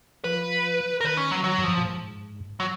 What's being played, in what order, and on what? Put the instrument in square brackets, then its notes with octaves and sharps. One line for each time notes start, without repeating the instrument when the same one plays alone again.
[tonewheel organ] F3 [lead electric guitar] B4
[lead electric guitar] A#4
[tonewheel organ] D#3 [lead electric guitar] B4
[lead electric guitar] C#4
F#3
[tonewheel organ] D#3 [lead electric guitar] F#3
[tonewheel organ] G#2
[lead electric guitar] F3
[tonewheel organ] A#2
G#2
[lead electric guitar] F#3